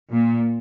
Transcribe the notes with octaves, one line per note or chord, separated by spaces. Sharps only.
A#2